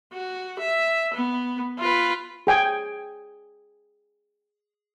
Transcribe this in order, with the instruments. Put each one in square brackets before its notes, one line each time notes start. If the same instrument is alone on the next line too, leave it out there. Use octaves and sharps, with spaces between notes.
[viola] F#4
E5
B3
F4 B4
[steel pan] G#4 G5 G#5